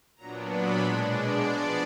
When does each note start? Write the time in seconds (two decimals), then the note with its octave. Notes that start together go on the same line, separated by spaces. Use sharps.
0.16 A#2 F#3 B3 D4 A#5
0.49 B5
0.79 B2 G#3 D4
1.10 D5
1.41 F3 B3 D4 D5